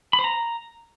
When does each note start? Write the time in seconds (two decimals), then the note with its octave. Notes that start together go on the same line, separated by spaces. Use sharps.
0.13 B5
0.19 C5
0.24 A#5